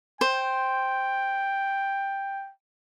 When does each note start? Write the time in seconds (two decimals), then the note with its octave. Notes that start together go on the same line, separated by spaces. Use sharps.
0.21 C5 G5